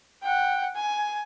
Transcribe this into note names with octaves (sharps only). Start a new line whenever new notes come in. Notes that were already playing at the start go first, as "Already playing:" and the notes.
F#5 G5
G#5